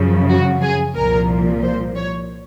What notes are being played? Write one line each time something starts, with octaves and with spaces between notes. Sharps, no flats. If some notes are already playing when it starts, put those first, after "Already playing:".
Already playing: F#2 C#3 F3
F#4
G#4
C2 A#2 F3 A#4
C5
C#5